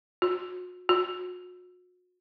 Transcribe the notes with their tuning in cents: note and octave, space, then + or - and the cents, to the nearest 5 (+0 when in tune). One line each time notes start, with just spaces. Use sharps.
F#4 -40
F#4 -40